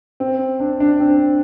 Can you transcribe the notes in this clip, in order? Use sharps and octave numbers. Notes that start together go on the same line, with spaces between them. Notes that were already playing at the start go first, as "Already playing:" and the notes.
C4
D4
D4
C4